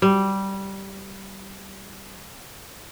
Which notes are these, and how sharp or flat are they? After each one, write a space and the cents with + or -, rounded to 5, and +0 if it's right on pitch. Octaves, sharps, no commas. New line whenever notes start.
G3 -10